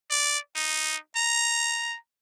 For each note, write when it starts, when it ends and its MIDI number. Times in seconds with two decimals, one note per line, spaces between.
0.11 0.38 74
0.55 0.97 63
1.16 1.97 82